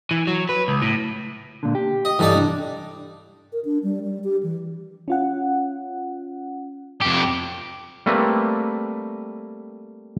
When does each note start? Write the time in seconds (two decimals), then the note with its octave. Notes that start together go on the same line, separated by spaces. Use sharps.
0.11 E3
0.27 F#3
0.49 B4
0.68 C#2
0.82 A2
1.63 A#2 D3
1.75 G4
2.05 D#5
2.19 G2 E3 G3 D#4 A4 D5
2.34 C2 D4
3.52 A#4
3.65 D4
3.83 G3
4.03 G3
4.24 G4
4.43 E3
5.08 C#4 F4 F#5
7.02 F2 G4
8.06 G3 A3 A#3 C4 B4